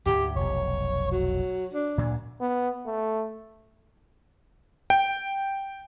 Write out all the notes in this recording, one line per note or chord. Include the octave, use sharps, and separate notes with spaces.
D2 G#2 G4
F1 B1 C#5
F#3
D4
D2 A#2 F#3
B3
A3
G5